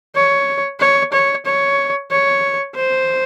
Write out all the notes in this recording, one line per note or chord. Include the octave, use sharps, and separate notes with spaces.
C#5
C#5
C#5
C#5
C#5
C5